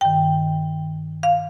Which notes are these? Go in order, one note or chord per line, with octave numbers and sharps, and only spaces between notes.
G2 D#3 G5
F5